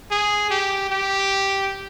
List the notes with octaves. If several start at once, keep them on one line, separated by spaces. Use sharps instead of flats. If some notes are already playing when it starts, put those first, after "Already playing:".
G#4
G4
G4